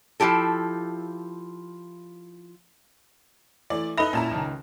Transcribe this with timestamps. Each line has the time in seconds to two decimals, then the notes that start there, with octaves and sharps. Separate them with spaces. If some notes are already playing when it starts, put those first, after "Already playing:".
0.20 F3 C4 E4 G4 A4
3.70 E3 A3 D5
3.98 D#4 A4 B4 D#5 E5 B5
4.13 A#2 C#4 E4 A5 A#5
4.31 C#2 D#3